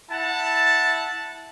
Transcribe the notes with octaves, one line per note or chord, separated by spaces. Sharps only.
E4 F#5 A5